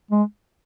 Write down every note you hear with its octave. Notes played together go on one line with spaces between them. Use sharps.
G#3